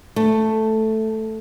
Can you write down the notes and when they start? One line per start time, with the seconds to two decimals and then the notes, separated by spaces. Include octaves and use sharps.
0.16 A3